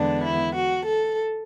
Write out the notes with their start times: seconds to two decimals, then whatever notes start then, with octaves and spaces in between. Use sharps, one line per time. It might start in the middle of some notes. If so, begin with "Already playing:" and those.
Already playing: E2 D3 G#3 B3 D4
0.23 E4
0.55 F#4
0.86 A4